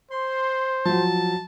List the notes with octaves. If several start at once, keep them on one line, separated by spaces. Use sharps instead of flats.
C5 C6
F3 F#3 A5